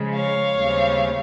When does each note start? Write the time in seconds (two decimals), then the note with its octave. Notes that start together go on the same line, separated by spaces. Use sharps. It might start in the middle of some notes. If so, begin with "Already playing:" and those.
Already playing: C#3 F3 G#3
0.15 C#5 F5
0.57 D#2 C#3 G3 C4